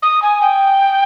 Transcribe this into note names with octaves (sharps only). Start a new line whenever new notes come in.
D#6
G#5
G5